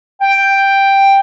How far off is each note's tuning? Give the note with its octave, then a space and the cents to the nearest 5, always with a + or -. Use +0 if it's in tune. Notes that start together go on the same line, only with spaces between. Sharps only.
G5 +5